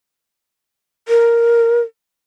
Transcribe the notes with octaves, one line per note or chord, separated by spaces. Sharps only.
A#4